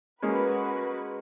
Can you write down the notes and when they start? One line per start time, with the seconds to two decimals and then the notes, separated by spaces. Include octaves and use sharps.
0.22 G#3 A#3 C#4 F#4 B4